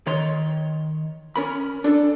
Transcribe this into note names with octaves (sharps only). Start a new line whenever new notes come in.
D#3 C#5 C6
C#4 A#4 B5
D4 A4